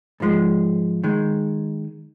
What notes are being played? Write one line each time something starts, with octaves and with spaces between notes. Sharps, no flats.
G#2 F3 G#3
D#3 G#3